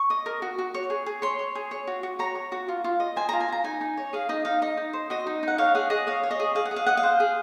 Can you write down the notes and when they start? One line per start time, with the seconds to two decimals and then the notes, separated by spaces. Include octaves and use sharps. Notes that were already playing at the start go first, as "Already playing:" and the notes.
Already playing: C#6
0.10 D#5
0.26 A#4
0.42 F#4
0.58 F#4
0.74 C#5
0.90 G#4
1.06 G#4
1.22 C#5 C6
1.39 C#5
1.55 G#4
1.71 C#5
1.87 F#4
2.03 F#4
2.19 C#5 A#5
2.35 C#5
2.52 F#4
2.68 F4
2.84 F4
3.00 D#5
3.16 C5 G#5
3.29 F4 A#5
3.40 G#5
3.48 F4 A#5
3.64 D#4 G#5
3.81 D#4
3.97 C#5
4.13 G#4 F5
4.29 D#4 D#5
4.45 D#4 F5
4.62 D#4 D#5
4.77 D#4
4.93 C5
5.10 F#4 D#5
5.27 D#4
5.43 D#4 F#5
5.58 C#5 F5
5.75 G#4 F#5
5.90 G#4 D#5
6.07 C#5 F5
6.23 C#5
6.31 D#5
6.40 G#4
6.55 G#4 F5
6.65 F#5
6.71 G#4
6.76 F5
6.86 D#5 F#5
6.97 F5
7.03 C5
7.20 G#4